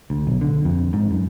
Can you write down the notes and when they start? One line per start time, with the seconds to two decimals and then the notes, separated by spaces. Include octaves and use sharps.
0.10 D2
0.27 B1
0.41 D3
0.65 F2
0.93 G#2
1.11 F#2